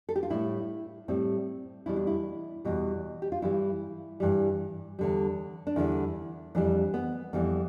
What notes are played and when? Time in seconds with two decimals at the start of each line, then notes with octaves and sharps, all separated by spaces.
0.09 A4
0.16 G4
0.23 F4
0.30 A2 G3 E4
1.08 A2 G3 C4
1.86 E2 B2 G3 E4
1.96 D4
2.07 E4
2.65 E2 B2 G3
3.22 G4
3.32 F4
3.42 G2 E3 G3 E4
4.20 G2 E3 G3
4.99 E2 D3 G3
5.67 D4
5.76 E2 D3 G3 E4
6.55 F2 E3 G3 D4
6.94 B3
7.33 F2 E3 G3 B3